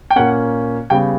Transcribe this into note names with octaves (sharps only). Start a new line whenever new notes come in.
G5
A#2 A#3 C#4 F#5
C#3 G3 B3 G5